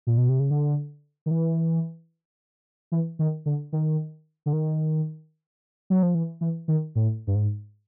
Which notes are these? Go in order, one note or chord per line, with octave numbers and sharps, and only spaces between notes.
A#2
B2
C3
C#3
D3
D#3
E3
E3
D#3
D3
D#3
D3
D#3
F#3
F3
E3
E3
D#3
A2
G2
G#2